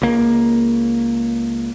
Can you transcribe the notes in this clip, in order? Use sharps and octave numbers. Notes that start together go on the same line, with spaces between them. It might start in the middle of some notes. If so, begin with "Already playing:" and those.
C#2 A#3